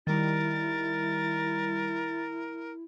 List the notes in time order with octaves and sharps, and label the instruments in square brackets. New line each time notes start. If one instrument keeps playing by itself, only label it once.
[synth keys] D#3 G3 [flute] E4 [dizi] A#4 [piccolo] A6